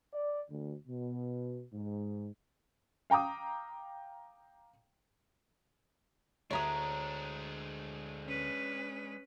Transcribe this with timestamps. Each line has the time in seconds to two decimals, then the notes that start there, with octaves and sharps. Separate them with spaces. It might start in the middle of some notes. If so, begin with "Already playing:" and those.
0.13 D5
0.50 D2
0.87 B2
1.73 G#2
3.10 F5 G5 A#5 D6 D#6
6.51 D2 G#3 D4 C#5 E5 A#5 D#6
8.26 C#4 B4